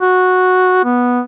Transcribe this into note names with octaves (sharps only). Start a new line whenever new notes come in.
F#4
B3